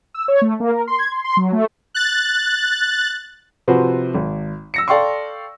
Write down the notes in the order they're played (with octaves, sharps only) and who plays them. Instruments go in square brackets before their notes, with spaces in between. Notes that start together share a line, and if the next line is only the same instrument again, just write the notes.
[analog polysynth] E6
C#5
A3
A#3
A#4
C6
G#6
C6
C6
F#3
A3
[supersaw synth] F#6 A6
[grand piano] C3 F3 F#4 B4 C5
G#1
E6 A#6 C#7
A4 D5 F5 G5 C6 C#6